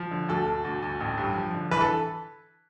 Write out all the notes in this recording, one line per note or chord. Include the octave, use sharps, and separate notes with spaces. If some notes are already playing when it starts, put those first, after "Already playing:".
Already playing: F3
D3
D2 A4
D2
D2
D2
A1
G2
F3
D3
E3 B4
A4